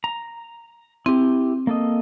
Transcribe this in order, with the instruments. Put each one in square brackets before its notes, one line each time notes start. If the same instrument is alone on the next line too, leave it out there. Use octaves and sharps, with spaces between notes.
[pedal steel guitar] A#5
[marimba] C4 [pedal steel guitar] E4 G4
[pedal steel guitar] A#3 A4 D#5